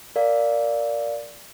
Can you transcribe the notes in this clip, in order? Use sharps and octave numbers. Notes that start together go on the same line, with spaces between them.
A#4 D5 F5